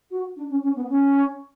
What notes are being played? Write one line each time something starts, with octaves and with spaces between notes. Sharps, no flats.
F#4
D4
C#4
C#4
B3
C#4